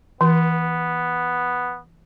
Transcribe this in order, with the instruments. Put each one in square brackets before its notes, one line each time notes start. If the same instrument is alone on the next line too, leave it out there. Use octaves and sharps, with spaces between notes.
[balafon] E3 [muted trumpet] B3